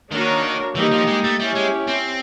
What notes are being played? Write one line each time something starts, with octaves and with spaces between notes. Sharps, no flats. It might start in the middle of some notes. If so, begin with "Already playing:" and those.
D#3 A#3 D4 F#4 A#4 C#5
E3 G3 A#3 D#4 G4
F3
G#3
A3
G3 C#4 E4 G4
G#3
C4